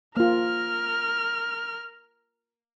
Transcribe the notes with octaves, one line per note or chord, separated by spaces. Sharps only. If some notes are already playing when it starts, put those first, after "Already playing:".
A#3 F4 A#4 F6